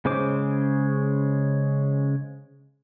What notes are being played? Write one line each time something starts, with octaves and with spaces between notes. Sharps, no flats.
C#3 G#3 C#4 C5 D6